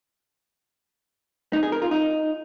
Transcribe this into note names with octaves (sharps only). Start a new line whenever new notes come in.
D#4
G#4
A#4
F4
D#4